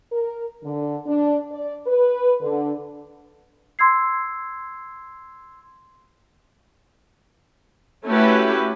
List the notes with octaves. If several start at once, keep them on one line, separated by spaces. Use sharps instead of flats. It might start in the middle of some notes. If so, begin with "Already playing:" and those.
A#4
D3
D4
D5
B4
D3
C6 E6 G#6 C7
A3 C#4 E4 F#4 G4 B4